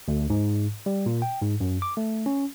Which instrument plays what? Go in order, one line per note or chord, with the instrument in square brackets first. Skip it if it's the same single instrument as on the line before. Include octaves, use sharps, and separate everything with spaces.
[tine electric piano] D2
G#2
G3
A#2
G5
G#2
F#2
D6
A3
C#4